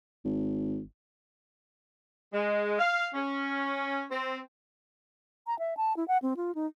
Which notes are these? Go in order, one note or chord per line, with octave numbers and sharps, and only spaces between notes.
G#1
G#3
F5
C#4
C4
A#5
E5
A5
E4
F#5
C4
F4
D#4